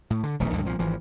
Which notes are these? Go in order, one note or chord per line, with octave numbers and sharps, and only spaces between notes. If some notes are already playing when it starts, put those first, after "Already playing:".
A2
D3
E1 A#1 D#3 A3
D2 G2 D3 D#3
C2 A#2 F3
G#1 E3 F3